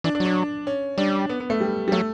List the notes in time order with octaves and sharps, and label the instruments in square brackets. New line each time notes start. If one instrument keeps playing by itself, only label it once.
[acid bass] E3 [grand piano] D4
[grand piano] D4
[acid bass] F#3
[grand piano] D4
C#4
[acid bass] G3 [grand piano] D4
[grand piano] B3
B3
A3
G3
G3
[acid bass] F#3 [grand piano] A3